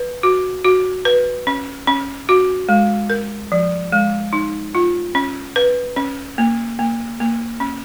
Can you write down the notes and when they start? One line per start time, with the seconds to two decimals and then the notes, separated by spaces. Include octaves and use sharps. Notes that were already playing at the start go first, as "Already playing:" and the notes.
Already playing: B4
0.23 F#4
0.65 F#4
1.05 B4
1.47 C#4
1.87 C#4
2.29 F#4
2.69 G#3
3.10 A#4
3.52 F3
3.92 G#3
4.33 D#4
4.75 F4
5.15 C#4
5.56 B4
5.96 C#4
6.38 A#3
6.79 A#3
7.20 A#3
7.60 C#4